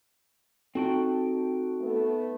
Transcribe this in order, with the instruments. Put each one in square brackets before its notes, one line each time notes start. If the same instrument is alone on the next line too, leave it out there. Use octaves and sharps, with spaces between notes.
[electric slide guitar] C4 F#4 G5 [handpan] D#4 A4
[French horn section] A3 B3